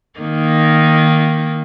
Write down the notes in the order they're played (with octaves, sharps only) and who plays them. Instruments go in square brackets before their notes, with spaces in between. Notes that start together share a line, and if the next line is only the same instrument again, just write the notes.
[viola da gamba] D#3 A#3 D#4